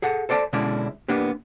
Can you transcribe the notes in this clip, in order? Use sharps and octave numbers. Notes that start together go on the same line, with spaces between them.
G#4 A4 F#5
A4 C5 D5 F5 A5
B2 D3 G#3 C#4 D4 E4
A#3 B3 D4 G4